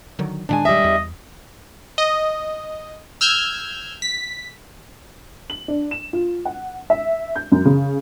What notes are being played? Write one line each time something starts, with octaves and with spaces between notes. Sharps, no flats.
D3 D#3 F#3
A#2 D#3 G#3 D4 G#5
G3 D#5 E5
E2
D#5
E6 F6 G6 G#6
B6
F#7
D4
E7
F4
F#5
E5
G6
F#2
C#3